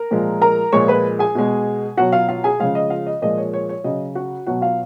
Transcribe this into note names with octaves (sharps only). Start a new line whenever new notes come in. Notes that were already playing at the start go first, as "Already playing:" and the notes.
Already playing: A#4 A#5
A#2 F3 G#3
A#4 A#5
A#2 F3 G#3 C#5 C#6
B4 B5
G#4 G#5
B2 G#3
B2 F#3 F#4 F#5
F4 F5
F4 F5
G#4 G#5
C#3 F3 G#3 F4 F5
D#5
F4 F5
D#5
A#2 F3 G#3 D#5
C#5
C#5
C#5
C#3 F#3 D#5
F#4 F#5
B2 F#3 F#4 F#5
F4 F5